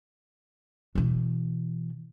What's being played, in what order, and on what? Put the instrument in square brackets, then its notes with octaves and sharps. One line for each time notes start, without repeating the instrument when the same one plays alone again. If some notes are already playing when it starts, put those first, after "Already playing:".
[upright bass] B2 E3